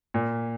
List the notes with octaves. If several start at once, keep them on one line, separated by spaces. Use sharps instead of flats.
A#2